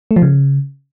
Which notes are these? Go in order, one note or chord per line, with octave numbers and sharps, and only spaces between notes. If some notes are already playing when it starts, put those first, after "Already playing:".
A3
F3
C#3